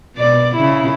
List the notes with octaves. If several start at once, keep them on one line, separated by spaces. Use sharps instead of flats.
B2 D5
C#3 E4